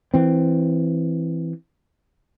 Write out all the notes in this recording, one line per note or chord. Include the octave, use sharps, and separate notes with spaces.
E3 C4